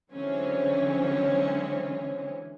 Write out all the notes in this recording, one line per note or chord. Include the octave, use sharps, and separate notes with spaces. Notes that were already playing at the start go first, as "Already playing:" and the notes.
D3 E3 F#3 G#3 C4 C#4